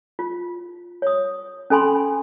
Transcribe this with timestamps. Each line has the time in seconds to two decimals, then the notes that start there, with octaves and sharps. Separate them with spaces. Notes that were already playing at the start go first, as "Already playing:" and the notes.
0.19 F4
1.02 C#5 D#6
1.70 C#4 A4 G#5 B5 C6